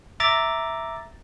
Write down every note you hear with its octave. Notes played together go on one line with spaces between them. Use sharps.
E5 A#5 D6 A6